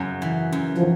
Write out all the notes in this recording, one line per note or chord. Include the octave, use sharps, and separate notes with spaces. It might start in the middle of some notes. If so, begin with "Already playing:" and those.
Already playing: F#2 C#3
E3
F#2
F3